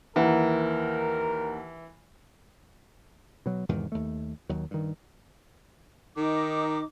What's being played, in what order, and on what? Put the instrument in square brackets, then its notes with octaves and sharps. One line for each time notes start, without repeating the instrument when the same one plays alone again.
[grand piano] D#2 F#5 [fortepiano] E3 [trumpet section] A#4
[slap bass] B2 F#3
E2 G#2 C3 D#3
D#2 A3
D#2 D#3 F#3
G2 D#3
[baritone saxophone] D#3 [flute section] D#4 D6